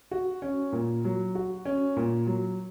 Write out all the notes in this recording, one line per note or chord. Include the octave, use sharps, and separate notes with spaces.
F#4
C#4
A#2
F#3
F#4
C#4
A#2
F#3